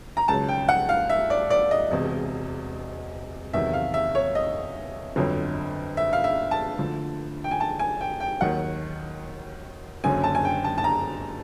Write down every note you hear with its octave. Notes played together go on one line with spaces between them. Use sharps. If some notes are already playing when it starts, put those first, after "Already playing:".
A#5
C#2 C#3 F#3 A5
G5
F#5
F5
E5
D5
D5
D#5
E1 E2 C3
E2 C3 D#3 F#3 E5
F5
E5
C#5
D#5
G1 F2 D3 F#3
E5
F5
E5
A5
D2 D3 F3
G5
G#5
A5
G#5
G5
G5
D#2 D#3 F#3 F#5
F#1 F#2 D3 F#3 G#5
A5
G#5
G5
A5
A5
A#5